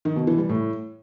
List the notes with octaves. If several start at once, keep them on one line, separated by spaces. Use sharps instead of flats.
D#3
B2
E3
G3
A2